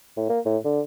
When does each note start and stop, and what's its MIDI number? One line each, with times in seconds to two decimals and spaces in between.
0.17 0.29 45
0.29 0.40 58
0.46 0.58 45
0.65 0.81 50